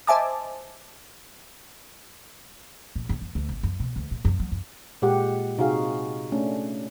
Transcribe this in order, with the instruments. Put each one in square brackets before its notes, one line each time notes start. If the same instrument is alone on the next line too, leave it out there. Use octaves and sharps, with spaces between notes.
[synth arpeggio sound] C5 D#5 E5 G#5 A5 D6
[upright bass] A#1
F#2
F#2
D2
G#1
F#2
B2
D2
A#2
F#2
F#3
F#2
[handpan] A#2 G#3 G4 F#5
C3 D#4 F4 F#4 G#4 F5
A3 C#4 D4